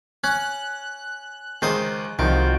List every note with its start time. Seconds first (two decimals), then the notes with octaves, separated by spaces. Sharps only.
0.24 C#4 F#6
1.62 C#2 D#3 C5 D#6
2.19 C2 D#3 F3 D#4 F4 F#4 G5